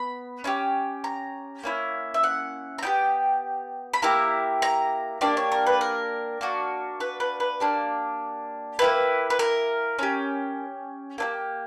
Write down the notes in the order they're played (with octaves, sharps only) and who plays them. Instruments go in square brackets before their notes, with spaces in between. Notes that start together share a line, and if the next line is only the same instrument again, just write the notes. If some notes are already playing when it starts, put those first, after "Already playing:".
Already playing: [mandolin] B3 B5
C#4 E4 G4
A#5
A#3 C#4 E4
E5
F#5
A#5
B3 E4 G4 G5
B5
A#3 E4 G4 A#5
A#5
A#3 D4 G4 D5
C#5
A#4
B4
A#4
A#3 D4 F#4
B4
B4
B4
A#3 D4 G4
A#3 E4 G4 B4
B4
A#4
C#4 G4
A#3 D4 G4